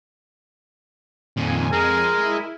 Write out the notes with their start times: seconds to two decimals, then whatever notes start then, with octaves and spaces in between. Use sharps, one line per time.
1.37 F2 A#2 D#3 G#5
1.73 G#3 A#4
2.18 E4